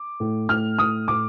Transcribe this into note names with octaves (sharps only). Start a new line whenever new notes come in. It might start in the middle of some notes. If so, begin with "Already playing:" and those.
Already playing: D6
A2
A2 F6
A2 D#6
A2 D6